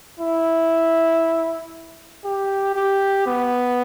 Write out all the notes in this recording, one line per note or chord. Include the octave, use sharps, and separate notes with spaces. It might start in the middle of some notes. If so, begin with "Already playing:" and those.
E4
G4
G4
B3